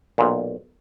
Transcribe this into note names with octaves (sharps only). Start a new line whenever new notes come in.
B1 A#2